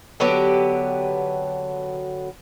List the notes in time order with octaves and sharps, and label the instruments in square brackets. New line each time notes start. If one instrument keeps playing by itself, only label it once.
[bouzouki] D3 F#3 B3 G4